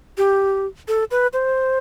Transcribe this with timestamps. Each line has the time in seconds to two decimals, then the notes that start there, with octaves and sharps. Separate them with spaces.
0.18 G4
0.88 A4
1.11 B4
1.33 C5